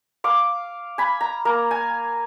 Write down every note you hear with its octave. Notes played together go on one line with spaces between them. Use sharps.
F5 D6
G#5 B5
A#5
A#3 A#5
G#5